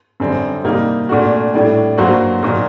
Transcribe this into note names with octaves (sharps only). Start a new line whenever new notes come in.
F#2 D3 G3 C4
C3 G3 A#3 D#4
A#2 A3 D4 F#4
A2 G3 D4
G2 F#3 A#3 F#4 C5
A#2 F#3 A#3 D#4